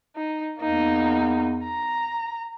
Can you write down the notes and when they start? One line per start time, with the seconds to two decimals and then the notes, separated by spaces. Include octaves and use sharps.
0.16 D#4
0.61 E2 A#3 D#4
1.64 A#5